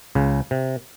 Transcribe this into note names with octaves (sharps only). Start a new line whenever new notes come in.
C#2 C#3
C3